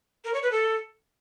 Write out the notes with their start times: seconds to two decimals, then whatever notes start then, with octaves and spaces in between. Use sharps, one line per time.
0.25 A#4
0.34 C#5
0.43 B4
0.52 A4